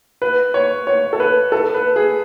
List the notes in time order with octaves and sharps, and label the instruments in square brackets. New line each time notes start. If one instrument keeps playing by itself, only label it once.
[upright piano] B4
C#5
C#5
A4
B4
A4
B4
G#4